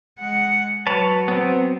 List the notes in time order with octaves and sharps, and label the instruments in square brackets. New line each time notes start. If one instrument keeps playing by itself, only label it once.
[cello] G#3 F#5
[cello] F#3 [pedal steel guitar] B4 C#5 A5
[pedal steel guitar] B3 C4